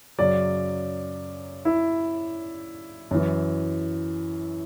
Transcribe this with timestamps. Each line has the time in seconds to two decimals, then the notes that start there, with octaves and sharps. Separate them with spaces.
0.18 F#2 C#3 F#3 D5
1.65 E4
3.11 F#2 E3